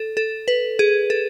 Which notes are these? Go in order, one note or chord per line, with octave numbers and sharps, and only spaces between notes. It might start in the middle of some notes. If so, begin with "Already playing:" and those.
Already playing: A4
A4
B4
G#4
A4